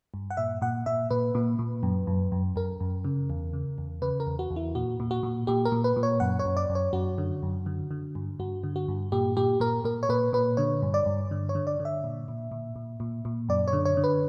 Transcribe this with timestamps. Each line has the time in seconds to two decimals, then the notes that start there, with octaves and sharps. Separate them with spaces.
0.14 G2
0.31 F#5
0.37 A#2 E5
0.62 A#2 F#5
0.86 A#2 E5
1.11 A#2 B4
1.35 A#2
1.59 A#2
1.83 F#2
2.07 F#2
2.32 F#2
2.56 F#2 A#4
2.80 F#2
3.04 C#3
3.30 E2
3.53 C#3
3.78 E2
4.02 C#3 B4
4.20 A#4
4.27 E2
4.39 F#4
4.50 E2
4.56 E4
4.75 A#2 F#4
5.00 A#2
5.11 F#4
5.23 A#2
5.47 A#2 G4
5.65 A#4
5.72 A#2
5.84 B4
5.96 A#2
6.03 C#5
6.20 F#2 F#5
6.39 C#5
6.45 F#2
6.57 D5
6.70 F#2
6.75 C#5
6.93 F#2 F#4
7.18 D3
7.43 F#2
7.66 D3
7.91 D3
8.15 G2
8.39 G2 F#4
8.64 D3
8.76 F#4
8.88 G2
9.12 A#2 G4
9.37 A#2 G4
9.60 A#2 A#4
9.84 A#2 A#4
10.03 C#5
10.09 A#2 B4
10.33 A#2 B4
10.57 D3 C#5
10.82 G2
10.94 D5
11.06 G2
11.31 D3
11.49 C#5
11.55 D3
11.67 D5
11.80 D3
11.85 E5
12.04 A#2
12.28 A#2
12.51 A#2
12.76 A#2
13.00 A#2
13.25 A#2
13.49 F#2 D5
13.68 C#5
13.73 D3
13.85 C#5
13.97 D3
14.04 B4